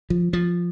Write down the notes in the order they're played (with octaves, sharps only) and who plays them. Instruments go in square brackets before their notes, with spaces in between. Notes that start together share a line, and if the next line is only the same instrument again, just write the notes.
[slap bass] F3
F3